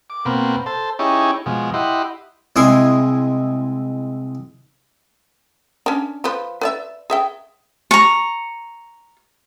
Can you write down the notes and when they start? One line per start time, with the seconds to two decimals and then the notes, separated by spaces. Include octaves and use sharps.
0.10 D6
0.25 B2 A#3 C4 B4
0.66 A4 C5 A5
0.99 C#4 D#4 E4 G4 G#4 C#5
1.46 B2 F3 G#3
1.74 E4 G4 D#5 F#5 B5 C6
2.56 C2 G#3 E4 G#5 C6 D#6
5.86 C#4 D4
6.24 F3 B4
6.61 B4 D5 E5
7.10 G#4 E5 G5
7.91 A#5 C#6